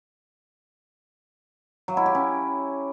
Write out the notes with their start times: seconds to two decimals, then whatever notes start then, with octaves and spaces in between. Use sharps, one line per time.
1.88 F#3
1.97 E4
2.06 G4
2.15 C#4